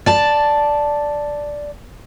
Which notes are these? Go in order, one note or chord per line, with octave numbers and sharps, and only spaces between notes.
D5 A5